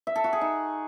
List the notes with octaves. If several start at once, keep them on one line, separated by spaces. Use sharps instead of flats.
E5
A4
F#4
G#4
D#4